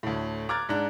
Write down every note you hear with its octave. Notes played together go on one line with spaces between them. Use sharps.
D2 A2
A#5 D6 F6 F#6 G#6 A6
G#2 D4 A#5 F#6